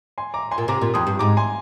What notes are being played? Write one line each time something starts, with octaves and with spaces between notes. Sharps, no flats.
G#5 C6
A#5 D6
G#5 C6
A#2
C3 A#5 D6
A#2
F2 C6 D#6
G2
G#2 A#5 D6
G#5 C6